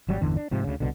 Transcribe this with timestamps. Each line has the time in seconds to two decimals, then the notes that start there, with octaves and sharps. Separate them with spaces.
0.09 G#1 F#3 G3
0.21 G1 E2 D3 E3
0.36 D4
0.51 G#2 C3 F3
0.64 D2 C#3
0.80 C2 B2 D3